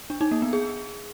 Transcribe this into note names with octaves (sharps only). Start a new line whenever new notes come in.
D4
D#4
A#3
B3
G#4